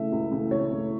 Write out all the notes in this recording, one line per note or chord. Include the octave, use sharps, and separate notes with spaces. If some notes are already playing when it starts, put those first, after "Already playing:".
Already playing: C#3 E3 A3 E5
C#2
C#3 E3 A3
C#2 C#5
C#3 E3 A3